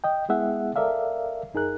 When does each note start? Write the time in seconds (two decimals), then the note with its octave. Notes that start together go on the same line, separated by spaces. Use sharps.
0.04 D#5 G5
0.29 G#3 B3 E4 G#4 E5 F#5
0.76 A4 A#4 D5 E5 F5
1.54 F#2 D#4 G#4 A#4 F#6